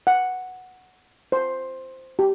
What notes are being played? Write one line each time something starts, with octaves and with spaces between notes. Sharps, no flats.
F#5
C5
G4